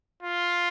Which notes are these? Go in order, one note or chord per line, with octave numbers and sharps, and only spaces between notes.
F4